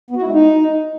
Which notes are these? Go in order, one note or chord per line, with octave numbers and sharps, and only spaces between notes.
B3
F#4
E4
G#3
D#4